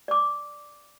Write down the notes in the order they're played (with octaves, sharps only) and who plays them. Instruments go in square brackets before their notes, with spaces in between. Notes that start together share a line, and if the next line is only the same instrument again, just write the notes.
[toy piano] D5 D6